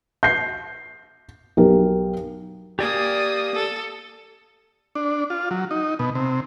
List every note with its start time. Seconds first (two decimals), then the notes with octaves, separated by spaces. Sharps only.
0.23 G6 C7
1.57 B1 G4 A#4
2.79 A#3 G4 D5 G#5 D#6
3.55 A4
4.95 D4
5.30 F4
5.51 F#3
5.71 D#4
5.99 B2
6.15 C3